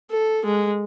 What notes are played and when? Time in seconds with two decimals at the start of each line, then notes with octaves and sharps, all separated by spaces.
0.10 A4
0.45 G#3